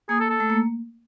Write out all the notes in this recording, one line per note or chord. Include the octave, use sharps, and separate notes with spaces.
A#3 G#4
A4
A4
A3
A#3